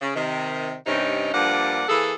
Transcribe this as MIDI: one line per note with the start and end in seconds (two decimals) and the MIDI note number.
0.01 0.11 49
0.15 0.73 48
0.15 0.73 51
0.85 1.31 43
0.85 1.31 48
0.85 1.31 61
0.85 1.31 63
1.32 1.84 43
1.32 1.84 53
1.32 1.84 58
1.32 1.84 62
1.32 1.84 78
1.88 2.13 52
1.88 2.13 58
1.88 2.13 68
1.88 2.13 69